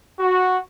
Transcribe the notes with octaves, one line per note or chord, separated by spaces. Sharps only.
F#4